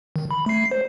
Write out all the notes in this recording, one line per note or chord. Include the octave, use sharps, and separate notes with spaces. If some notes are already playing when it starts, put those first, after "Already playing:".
D#3
B5
A3 C7
C5